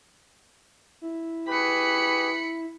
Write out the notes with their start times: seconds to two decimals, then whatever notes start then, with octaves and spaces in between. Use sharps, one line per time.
1.02 E4
1.48 G4 G#4 B4 B5 C#7